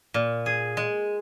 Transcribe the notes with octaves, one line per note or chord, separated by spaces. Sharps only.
A#2
G#4
G#3